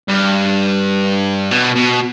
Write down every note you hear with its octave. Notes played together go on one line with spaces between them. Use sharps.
G2
B2
B2